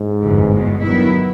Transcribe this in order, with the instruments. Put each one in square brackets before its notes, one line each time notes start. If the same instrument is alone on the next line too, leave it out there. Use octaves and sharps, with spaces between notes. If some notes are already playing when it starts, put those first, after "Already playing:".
Already playing: [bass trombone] G#2
[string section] G1 F2 C3 E3
E2 B2 G#3
[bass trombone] G2 [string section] D#3 F#3 B3 E4